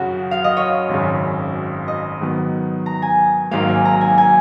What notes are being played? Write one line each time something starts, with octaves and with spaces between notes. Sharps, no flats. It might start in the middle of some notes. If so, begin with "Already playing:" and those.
Already playing: F#2 C#3 F#3 C#4 F#4
F5
D#5
C#5
G#1 F#2 C#3
D#5
G#2 D#3 F#3 B3
A#5
G#5
G#1 G#2 F#3 A#3 F5
G#5
A#5
G#5
G#5